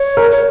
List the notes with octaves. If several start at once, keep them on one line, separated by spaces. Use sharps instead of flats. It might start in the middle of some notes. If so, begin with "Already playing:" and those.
Already playing: C#5
A#4
C#5